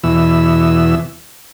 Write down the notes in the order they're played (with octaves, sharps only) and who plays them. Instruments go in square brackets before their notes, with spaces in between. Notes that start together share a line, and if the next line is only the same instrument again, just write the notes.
[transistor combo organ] E2 B2 E3 E6